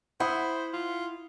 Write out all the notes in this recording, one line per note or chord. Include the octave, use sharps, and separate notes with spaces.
E4 C5 F#5 B5 D#6
F4